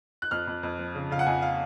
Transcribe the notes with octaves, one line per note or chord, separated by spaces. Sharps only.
F#6
F2 F6
F2
F2
F3
C#3
C#3 F5
F#5
F2 G#5
F5